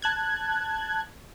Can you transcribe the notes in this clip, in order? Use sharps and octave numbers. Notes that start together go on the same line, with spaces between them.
A5 F#6 G#6